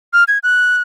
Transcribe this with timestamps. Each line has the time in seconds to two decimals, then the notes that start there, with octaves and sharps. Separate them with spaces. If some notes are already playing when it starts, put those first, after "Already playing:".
0.13 F6
0.28 G#6
0.43 F#6